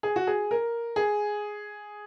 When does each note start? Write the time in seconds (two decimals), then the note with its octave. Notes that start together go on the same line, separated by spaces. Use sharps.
0.03 G#4
0.16 F#4
0.27 G#4
0.51 A#4
0.96 G#4